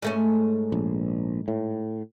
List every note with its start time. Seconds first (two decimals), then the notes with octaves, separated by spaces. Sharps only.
0.02 G#2 A3 C#4
0.72 A#1
1.48 A2